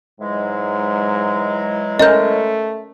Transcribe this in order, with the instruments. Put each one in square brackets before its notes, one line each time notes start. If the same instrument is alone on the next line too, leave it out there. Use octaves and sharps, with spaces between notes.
[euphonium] G#2 [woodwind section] E3 F#3 G#3
[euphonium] A3 [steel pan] C#4 A#4 [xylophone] D#5 G6